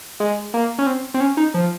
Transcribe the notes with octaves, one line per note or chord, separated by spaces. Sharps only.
G#3
A#3
C#4
C4
C4
C#4
D#4
F3